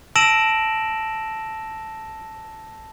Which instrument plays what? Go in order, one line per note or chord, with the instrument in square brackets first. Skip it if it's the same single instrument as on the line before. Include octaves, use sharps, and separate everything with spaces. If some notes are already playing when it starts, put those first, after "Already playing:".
[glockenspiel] A5 E6 A#6 D7 E7 F#7